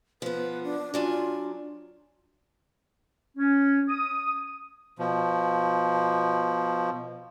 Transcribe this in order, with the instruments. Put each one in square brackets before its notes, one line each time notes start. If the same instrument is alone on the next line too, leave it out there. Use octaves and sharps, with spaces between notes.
[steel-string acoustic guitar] F3 B3 [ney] B4
[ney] D4
[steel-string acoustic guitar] F#3 D4 G#5 [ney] F4
[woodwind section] C#4
D#6
[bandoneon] B2 F3